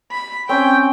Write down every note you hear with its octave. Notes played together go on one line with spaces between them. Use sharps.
B5
C4 C#4 G5 G#5